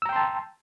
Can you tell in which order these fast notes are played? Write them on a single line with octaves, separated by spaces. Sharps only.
E6 A#5 G5 C6 A5